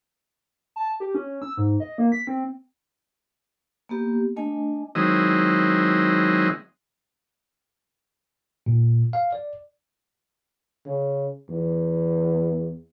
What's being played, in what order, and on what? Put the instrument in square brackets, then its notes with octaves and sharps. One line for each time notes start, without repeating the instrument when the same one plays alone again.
[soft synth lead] A5
G4
C#4
E6
G#2
D#5
A#3
B6
C4
[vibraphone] A#3 B3 G4
A3 D4 D#5 G#5
[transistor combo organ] D#3 F#3 G#3 C4 E4 D#5
[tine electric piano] A#2
F5
D5
[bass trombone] C#3
E2